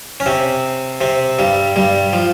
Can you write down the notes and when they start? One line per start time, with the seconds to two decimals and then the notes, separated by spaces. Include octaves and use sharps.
0.20 C#4
0.26 C3 C4
1.01 C3 C4
1.39 G2 G3
1.76 G2 G3
2.13 F3